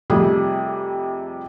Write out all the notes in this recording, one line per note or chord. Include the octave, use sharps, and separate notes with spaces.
F2 C3 G3 A3 G#4 D#6